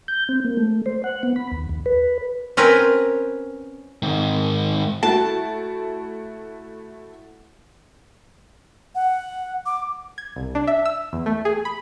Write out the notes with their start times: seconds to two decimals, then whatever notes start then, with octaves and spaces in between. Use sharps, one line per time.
0.08 G6
0.29 C4
0.45 A#3
0.57 A3
0.86 C5
1.04 F#5
1.23 B3
1.36 B5
1.52 D#2
1.69 D#2
1.86 B4
2.57 C4 C#4 A#4 B4
4.02 G#2 D#3
5.03 A3 E4 F#4 A5
8.95 F#5
9.66 D6
10.18 G#6
10.36 C2
10.55 D4
10.67 E5
10.86 E6
11.13 E2
11.26 A3
11.45 G#4
11.65 B5